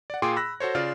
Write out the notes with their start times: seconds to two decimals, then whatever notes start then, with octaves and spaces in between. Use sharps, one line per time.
0.10 D5 F#5
0.22 A#2 F4 G#4 G5 C6 D6
0.36 B5 E6 F#6 A#6
0.60 F#4 A4 C5 C#5
0.75 C#3 F4 D5 F6